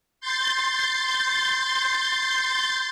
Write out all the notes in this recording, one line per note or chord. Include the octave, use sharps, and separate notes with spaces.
C6 G6 A6